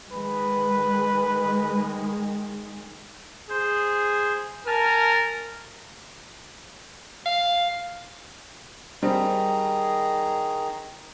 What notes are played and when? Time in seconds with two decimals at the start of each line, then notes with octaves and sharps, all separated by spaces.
0.11 D#3 G#3 B4
3.50 G#4 C5
4.67 A#4 G#5 A5 F6
7.26 F5
9.03 D#3 G3 C4 G#4 A#5